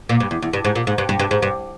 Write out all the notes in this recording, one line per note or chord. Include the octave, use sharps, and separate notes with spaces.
A#2
G2
E2
E2
G2
G#2
A#2
G#2
G2
G2
G2
G#2
G2